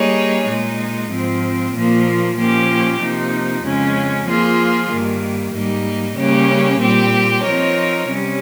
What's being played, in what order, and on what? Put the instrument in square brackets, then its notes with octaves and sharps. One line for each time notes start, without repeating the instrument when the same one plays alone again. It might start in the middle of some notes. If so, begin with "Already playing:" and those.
Already playing: [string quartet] G3 A#3 D#4 G#4 C#5
A#2 G#3 D#4
G#2 F3 C4
A#2 F3 A#3
A#2 F3 A#3 C#4 G4
C3 F3 A#3 D#4
F2 C#3 G#3 C#4
F3 A#3 F4 G#4
G2 D#3 A#3
G#2 G3 A#3 D#4
C#3 G3 A#3 C#4 G4
A#2 G3 C4 G4
F3 C4 D#4 A#4 C#5
C3 G3 C#4